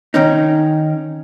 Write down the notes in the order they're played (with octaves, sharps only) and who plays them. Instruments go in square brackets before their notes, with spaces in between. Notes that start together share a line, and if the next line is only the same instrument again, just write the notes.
[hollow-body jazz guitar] D#3 C#4 D#4